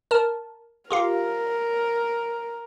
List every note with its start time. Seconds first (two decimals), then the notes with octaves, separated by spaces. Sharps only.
0.11 A#4 A5
0.91 F4 G4 A#4 F5